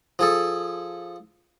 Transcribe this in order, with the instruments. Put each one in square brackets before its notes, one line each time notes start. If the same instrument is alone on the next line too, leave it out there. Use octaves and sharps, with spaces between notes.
[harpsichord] F3 G#4 A4